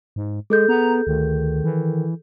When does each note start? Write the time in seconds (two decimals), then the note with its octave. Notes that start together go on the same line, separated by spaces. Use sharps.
0.16 G#2
0.50 G#3 G#4 A4 G6
0.68 B3 A#5
1.07 D2 D#3
1.64 E3